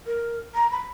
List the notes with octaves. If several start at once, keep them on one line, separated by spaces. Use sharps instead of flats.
A#4
A#5
B5